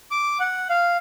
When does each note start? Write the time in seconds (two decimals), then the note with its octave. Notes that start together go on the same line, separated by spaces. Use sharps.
0.11 D6
0.40 F#5
0.69 F5